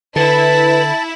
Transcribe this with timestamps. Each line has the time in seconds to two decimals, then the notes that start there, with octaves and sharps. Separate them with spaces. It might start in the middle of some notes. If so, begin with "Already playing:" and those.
0.16 D3 E4 B4 A5